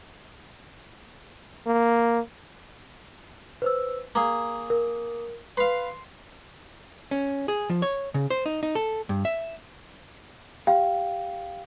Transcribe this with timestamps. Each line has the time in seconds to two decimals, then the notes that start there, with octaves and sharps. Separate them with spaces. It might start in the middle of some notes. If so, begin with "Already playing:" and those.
1.67 A#3
3.62 B4 C5 E6
4.15 A#3 G#4 A#5
4.70 A#4
5.57 B4 F5 C6 C7
7.11 C#4
7.48 G#4
7.70 F3
7.82 C#5
8.14 C#3
8.30 C5
8.46 D#4
8.63 D#4
8.75 A4
9.09 G2
9.25 E5
10.67 G4 F5 G5